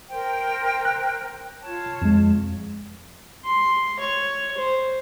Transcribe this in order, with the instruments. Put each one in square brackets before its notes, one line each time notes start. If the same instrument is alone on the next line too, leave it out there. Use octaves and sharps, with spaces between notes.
[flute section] A#4 C5 G5
[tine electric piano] F#6
[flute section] F4 C#5 A5
[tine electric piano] F2 G#3
[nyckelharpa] C6
C#5
C5